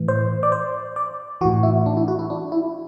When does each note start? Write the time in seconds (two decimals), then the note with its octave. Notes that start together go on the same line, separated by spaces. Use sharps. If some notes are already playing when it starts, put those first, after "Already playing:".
Already playing: A2 E3
0.08 C5
0.43 D5
0.52 C5
0.96 D5
1.41 E3 F#4
1.45 A2
1.63 E4
1.86 D4
1.97 E4
2.08 F#4
2.19 E4
2.30 D4
2.52 E4